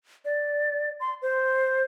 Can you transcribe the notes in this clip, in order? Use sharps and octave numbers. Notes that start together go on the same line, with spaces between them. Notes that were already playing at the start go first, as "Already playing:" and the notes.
D5
C6
C5